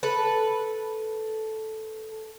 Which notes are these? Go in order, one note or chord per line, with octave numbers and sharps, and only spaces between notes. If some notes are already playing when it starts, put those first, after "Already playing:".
A4 B4